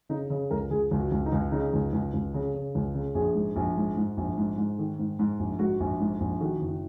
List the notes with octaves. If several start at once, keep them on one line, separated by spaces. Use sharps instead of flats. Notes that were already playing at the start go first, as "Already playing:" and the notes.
C#3 D#4
C#3
C#2 A#4
C#2 G#4
C#2
F#4
C#2
D#4
C#2
C#3 D#4
C#2
C#2
C#2
C#3
C#3
C#2
C#3
A#1 G#4
G#2
A#1
G#2
G#2
A#1
G#2
G#2
D#3
G#2
G#2
A#1
G#2 F#4
A#1
G#2
A#1
D#3 F#4
F#1